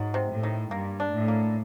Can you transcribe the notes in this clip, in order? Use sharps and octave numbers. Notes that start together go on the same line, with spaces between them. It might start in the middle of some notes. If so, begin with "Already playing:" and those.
Already playing: G#2 F#3
C3
A2
D#3
G2 A#3
D4
A2
A#3